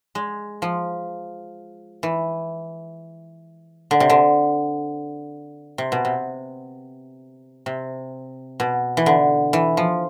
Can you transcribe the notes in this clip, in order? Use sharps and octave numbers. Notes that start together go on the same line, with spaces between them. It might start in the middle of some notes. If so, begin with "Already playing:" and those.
G#3
F3
E3
D3
C3
D3
C3
B2
C3
C3
B2
E3
D3
E3
F3